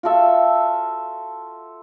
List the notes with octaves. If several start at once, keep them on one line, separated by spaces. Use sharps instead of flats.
F4 F#4 A4 E5